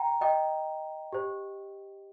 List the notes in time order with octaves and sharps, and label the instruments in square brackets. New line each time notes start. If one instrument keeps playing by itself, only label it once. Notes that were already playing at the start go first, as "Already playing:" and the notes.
Already playing: [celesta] G5 A#5
D#5 G5
G4 C5